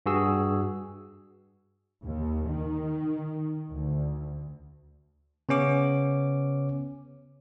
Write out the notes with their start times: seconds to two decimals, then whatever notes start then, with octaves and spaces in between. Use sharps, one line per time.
0.06 G2 F#4 G#4 E6
2.04 D#2
2.47 D#3
3.71 D2
5.49 C#3 B3 C#4 D6